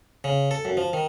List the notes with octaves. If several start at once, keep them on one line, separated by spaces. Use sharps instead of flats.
C#3
A4
F#2
F3
D#3